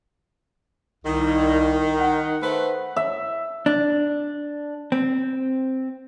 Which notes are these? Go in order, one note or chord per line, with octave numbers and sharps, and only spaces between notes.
C2 D#3
F#5
A3 B4 C5
E5
D4
C4